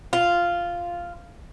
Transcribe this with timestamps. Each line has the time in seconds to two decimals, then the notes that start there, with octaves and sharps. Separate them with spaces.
0.13 F4